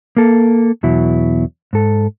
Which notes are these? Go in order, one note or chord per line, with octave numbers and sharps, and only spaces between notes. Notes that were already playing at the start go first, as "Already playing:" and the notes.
A#3 A4
E2 B2 F#3 E4
G#2 A4